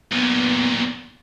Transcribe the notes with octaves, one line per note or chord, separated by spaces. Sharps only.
B1 A#2 B3